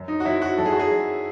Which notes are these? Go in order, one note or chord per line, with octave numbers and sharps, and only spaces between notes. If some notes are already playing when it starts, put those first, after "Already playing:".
Already playing: F#2
D#4
F#4
F#2 E4
F#4
F#2 A4
G#4
F#4
G#4
F#2